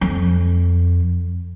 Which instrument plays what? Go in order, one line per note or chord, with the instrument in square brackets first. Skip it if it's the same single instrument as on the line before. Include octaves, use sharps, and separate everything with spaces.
[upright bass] F2